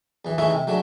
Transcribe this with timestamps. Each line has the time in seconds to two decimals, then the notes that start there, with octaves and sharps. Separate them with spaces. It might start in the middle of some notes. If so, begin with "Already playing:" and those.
0.25 E2 E3
0.38 E3 G#3 A3 D#4 E4 C#5
0.51 C3
0.67 F#3 G#3 A3 D4